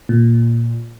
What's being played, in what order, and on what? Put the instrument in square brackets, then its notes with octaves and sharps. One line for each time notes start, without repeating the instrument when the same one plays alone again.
[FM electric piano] A#2